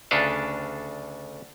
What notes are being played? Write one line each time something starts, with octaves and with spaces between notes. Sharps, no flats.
D2 C#3 D4 A4 B4 F5